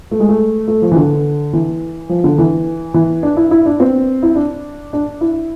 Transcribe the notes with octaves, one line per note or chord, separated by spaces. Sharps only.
A3
G#3
A3
A3
F3
E3
D3
E3
F3
D3
E3
E3
D4
E4
E4
D4
C4
E4
D4
D4
E4